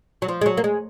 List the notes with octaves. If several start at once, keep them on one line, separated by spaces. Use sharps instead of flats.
F#3
F3
G#3
F#3
A#3
G#3